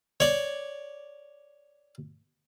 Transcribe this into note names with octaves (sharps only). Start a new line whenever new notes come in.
C#5 D5